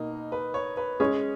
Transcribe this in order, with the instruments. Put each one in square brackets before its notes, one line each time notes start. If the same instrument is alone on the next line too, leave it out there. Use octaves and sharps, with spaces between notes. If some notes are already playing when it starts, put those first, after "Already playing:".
Already playing: [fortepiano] B2 A#3 [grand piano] D#4
[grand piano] B4
C#5
B4
[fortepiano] G#3 C#4 G#4 [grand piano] C#5